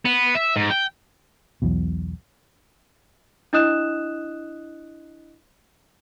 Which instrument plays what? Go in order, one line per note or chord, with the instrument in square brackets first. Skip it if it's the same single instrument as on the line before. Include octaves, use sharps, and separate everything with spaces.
[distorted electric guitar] B3
E5
G#2
G5
[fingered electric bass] B1 E2 B2
[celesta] D4 E4 D#5 D#6 F#6 E7